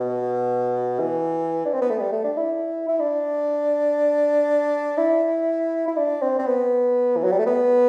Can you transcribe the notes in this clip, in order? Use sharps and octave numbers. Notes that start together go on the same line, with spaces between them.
B2
E3
D4
C4
B3
A3
G3
A3
D4
E4
E4
D4
E4
E4
D4
C4
C4
B3
E3
F#3
G3
A3
B3